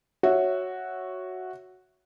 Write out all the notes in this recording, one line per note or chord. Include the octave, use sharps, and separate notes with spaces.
F#4 C#5 E5